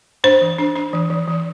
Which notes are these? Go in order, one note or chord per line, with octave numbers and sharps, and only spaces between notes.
D4 C5
E3
D4
D4
E3
E3
E3